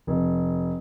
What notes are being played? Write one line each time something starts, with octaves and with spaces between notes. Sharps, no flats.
F1